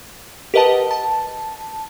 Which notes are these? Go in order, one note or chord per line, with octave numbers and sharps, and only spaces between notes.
G4 A#4 B4 D#5 F#5 A5
A5